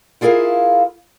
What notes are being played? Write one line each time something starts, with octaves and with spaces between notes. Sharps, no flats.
E4 F4 G#4 A#4 F5